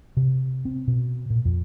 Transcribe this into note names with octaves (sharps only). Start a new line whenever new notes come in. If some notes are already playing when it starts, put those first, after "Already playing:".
C3
C4
B2
A#2
F2